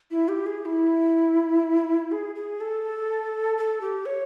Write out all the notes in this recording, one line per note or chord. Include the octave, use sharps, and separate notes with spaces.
E4
G4
G#4
E4
G#4
G#4
A4
A4
G4
C#5